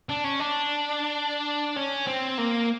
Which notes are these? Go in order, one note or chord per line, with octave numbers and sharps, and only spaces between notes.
D4
C#4
D4
C#4
C4
A#3